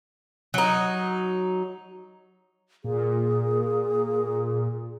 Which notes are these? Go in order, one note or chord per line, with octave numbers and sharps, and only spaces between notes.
F#3 D#4
A#2 G#4